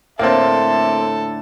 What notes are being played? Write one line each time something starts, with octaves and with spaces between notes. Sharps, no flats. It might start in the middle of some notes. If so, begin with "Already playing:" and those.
A2 D3 A#3 C4 A4 E5